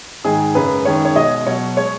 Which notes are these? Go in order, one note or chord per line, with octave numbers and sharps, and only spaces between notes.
G#2 D#3 G#3 G#4
F#2 C#3 G#3 B4
F#2 D#3 G#3 C#5
C#5
B2 G#3 D#5
B2 F#3 C#5
G#3 C#5